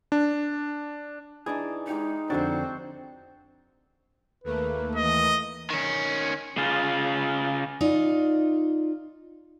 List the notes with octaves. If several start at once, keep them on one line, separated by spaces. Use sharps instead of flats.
D4
E3 D4 D#4 G#4
G#3 D#4 G4 F5
F2 D3 C4 D4 F#4 C5
D#2 A3 A#3 B4
E3 D#5
D#3 C#4
C#3 F4
D#4 F4 D5